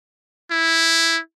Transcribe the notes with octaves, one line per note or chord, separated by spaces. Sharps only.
E4